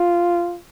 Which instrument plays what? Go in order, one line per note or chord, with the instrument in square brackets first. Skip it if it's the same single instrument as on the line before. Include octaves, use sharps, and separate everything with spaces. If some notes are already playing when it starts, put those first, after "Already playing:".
Already playing: [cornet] F4